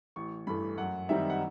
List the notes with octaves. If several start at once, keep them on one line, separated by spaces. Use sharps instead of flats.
A1 C#6
G2 E3 A3 B5
F#2 F#5
D#3 G3 C4 D#4 E5
F#5